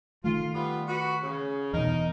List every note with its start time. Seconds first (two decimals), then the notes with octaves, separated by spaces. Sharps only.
0.24 D#3 A3 F4
0.53 G3 B3 F4
0.88 F#4 B4
1.22 C#3
1.73 E2 B2 D#4 A#4